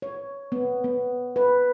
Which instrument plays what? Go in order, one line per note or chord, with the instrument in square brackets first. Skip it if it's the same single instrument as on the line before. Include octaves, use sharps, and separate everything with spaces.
[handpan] C#5
B3
B3
B4